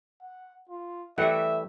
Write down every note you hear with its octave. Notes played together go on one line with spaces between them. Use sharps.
F#5
F4
E3 G3 A3 G4 E5 F#5